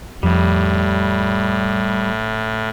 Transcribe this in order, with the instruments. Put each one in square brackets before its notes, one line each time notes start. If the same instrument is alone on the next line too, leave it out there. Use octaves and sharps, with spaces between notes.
[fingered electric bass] F2 [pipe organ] A2 [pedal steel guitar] G3